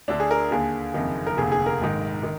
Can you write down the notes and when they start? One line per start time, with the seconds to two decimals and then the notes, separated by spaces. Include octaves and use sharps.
0.08 D2 D3 D4
0.20 G#4
0.31 A#4
0.51 D#2 D3 G#4
0.94 F#1 F2 D#3
1.27 A#4
1.37 F1 D#2 D3 G#4
1.52 G#4
1.66 A#4
1.81 A#1 G#2 D#3
2.23 D#3